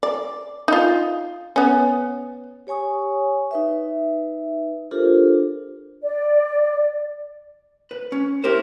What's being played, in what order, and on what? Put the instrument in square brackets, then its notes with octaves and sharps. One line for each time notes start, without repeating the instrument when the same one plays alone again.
[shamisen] D5
D#4 F4
B3 C#4
[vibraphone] G4 C#5 G#5 C#6 D#6
D#4 B4 E5
D4 F4 G4 A4 A#4 C5
[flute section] D5
[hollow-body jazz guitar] B4
C#4
E4 G4 A#4 C5